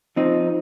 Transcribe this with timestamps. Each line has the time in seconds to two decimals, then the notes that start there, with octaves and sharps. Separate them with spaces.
0.16 F3 C4 D#4